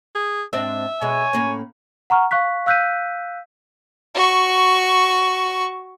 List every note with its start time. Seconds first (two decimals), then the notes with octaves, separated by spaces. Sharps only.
0.15 G#4
0.53 G#2 C4 D4 E5
1.02 B2 G#3 C#5 G#5
1.33 A2 A#3 C#4
2.10 F#5 A#5 C#6 F6
2.31 F5 C#6 F#6 B6
2.66 F5 E6 F#6 G6 B6 D#7
4.14 F#4 C#6